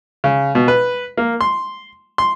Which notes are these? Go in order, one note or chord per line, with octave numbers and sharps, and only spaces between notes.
C#3
B2
B4
A#3
C6
C6